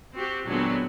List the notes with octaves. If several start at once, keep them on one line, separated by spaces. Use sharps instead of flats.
C4 F#4 G4
A#2 D3 F#3 G#3 B3 C4